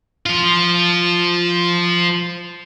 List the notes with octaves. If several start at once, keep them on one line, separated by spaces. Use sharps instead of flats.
F3 F4